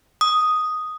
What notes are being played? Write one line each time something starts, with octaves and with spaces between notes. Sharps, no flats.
D#6